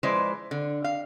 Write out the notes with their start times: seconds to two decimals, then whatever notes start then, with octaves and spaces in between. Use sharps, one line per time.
0.03 F3 G#3 E4 B4 C5 D5
0.51 D3
0.84 F5